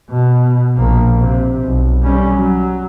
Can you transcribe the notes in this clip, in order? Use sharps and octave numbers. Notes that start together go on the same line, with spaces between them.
B2
A#1 A#3
C3
B1
G3 C#4
F#3